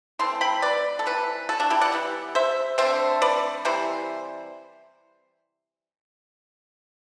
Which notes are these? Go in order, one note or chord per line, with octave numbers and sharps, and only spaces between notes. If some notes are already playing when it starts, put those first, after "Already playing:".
E3 A3 C4 C6
G5 B5
B4 D5
A4
C3 E3 G3 B4
F#4 A4
D4 F#4
E4 G4
D5 F#5
E3 G3 B3
C5 E5
D3 A3 C4 C5 E5
B4 D5
C3 E3 G3 C5